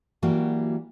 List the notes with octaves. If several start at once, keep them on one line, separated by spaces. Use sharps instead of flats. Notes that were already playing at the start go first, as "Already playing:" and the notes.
E3 F#3 G3 A#3 F#4 G4